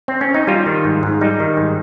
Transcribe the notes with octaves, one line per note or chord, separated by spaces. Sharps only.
C4
C#4
D#4
G3 F4
D#3
G#2
G#2
G3 D#4
D#3
G#2